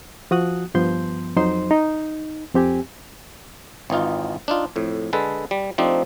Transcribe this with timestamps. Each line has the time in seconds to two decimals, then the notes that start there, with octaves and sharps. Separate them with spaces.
0.31 F3 F#4 D#6 F#6
0.74 G2 F3 B3 C6 G6
1.36 F2 F#3 D#4 C5 C6
1.71 D#4
2.54 F2 C4 G4 G#5
3.90 G#1 E3 D#4 F4
4.48 D4 D#4 F4
4.76 F2 A2
5.13 D3 G#3 A4 B4
5.51 G3
5.78 F3 A3 C4 D4 D#4 G4